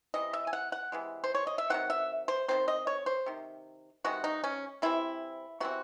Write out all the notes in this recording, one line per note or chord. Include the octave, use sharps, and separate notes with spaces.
C3 E3 D#5
E5
G#5
F#5
F#5
C3 E3 G#3
C5
C#5
D#5
E5
D#3 F#3 C4 F#5
E5
C5
D#3 F#3 C4 C5
D#5
C#5
C5
C3 D#3
C3 D#3 G#3 F#4
D#4
C#4
C3 E3 C4 E4
C3 E3 C4 F#4